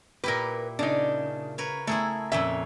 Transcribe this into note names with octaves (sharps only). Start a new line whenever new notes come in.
A#2 E4 G4 A#4 B4
C#3 D4 D#4
A#4 B4 C#5
A3 E4 G#4 A#4
F2 A#2 C#4 E5